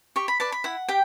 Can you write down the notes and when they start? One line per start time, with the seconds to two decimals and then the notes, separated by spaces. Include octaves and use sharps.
0.16 G4 C#6
0.28 B5
0.40 B4 D5 A5
0.52 B5
0.64 E4 F#5
0.88 G4 G5